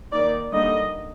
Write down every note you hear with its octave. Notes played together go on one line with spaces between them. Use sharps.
D#3 A#3 D#4 D5
D3 G3 A#3 D#4 D#5